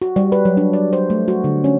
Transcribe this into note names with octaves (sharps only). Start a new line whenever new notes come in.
F#4
G3
B4
F#3
D4
D5
C5
A3
F#4
D3
C#4